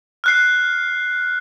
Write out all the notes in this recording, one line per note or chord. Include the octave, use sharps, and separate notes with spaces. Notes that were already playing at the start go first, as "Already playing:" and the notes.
F6 F#6 C7